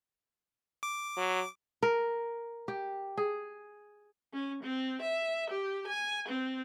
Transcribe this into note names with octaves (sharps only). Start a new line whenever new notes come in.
D6
F#3
A#4
G4
G#4
C#4
C4
E5
G4
G#5
C4